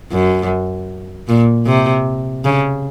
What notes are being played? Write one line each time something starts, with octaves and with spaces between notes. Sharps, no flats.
F#2
A#2
C3
C#3